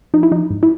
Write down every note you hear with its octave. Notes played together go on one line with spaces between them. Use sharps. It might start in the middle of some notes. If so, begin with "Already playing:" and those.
F3 D#4
E4
F3 D#4
G#2
E4